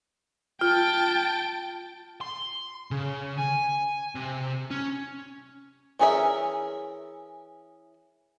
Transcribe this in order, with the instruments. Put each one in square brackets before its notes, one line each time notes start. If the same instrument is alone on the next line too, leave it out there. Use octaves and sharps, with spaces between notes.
[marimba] F4 [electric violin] G5 A5
[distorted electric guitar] C6
C#3
G#5
C3
C#4
[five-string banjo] E3 C#4 G#4 A#4 E5